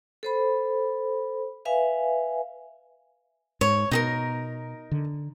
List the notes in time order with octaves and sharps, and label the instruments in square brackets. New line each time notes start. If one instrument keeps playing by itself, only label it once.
[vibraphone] A4 C5 B5
B4 E5 F5 G#5
[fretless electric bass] G#2 [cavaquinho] C#5
[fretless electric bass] B2 [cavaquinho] D#4 G#4 A#4
[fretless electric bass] D3